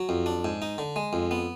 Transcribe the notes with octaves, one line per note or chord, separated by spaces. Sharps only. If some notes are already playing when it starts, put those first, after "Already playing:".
Already playing: F#3
F2
D4
G#2
D#4
D3
G#3
F2
B3